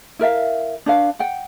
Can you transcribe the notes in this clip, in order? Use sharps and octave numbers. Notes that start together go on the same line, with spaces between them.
E4 A#4 E5 F5
D4 B4 F5
F#5 G5